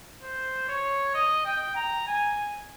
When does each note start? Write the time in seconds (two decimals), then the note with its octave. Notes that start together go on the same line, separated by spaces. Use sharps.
0.23 C5
0.68 C#5
1.14 D#5
1.45 G5
1.76 A#5
2.07 G#5